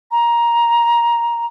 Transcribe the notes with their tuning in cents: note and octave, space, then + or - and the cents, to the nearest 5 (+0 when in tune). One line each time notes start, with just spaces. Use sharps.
A#5 +10